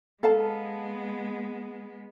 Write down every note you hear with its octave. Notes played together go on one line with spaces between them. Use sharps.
G#3 B3 A4 F5 A5